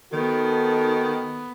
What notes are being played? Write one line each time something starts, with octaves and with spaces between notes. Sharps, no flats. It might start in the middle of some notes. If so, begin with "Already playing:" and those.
D#3 B3 D#4 F#4 A4